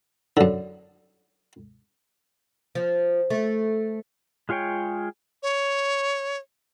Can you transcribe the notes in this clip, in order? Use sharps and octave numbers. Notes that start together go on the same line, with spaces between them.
F#2 D3
F3
A3
G#3 F4 G#4 C#5 G5
C#5